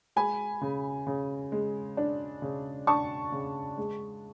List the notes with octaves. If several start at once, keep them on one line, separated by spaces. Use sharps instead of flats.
G#3 G#5 B5
C#3
C#3
G#3
D4
C#3
D4 A5 C#6
C#3
G#3